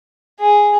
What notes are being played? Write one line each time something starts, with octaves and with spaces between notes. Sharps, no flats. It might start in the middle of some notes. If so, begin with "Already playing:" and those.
G#4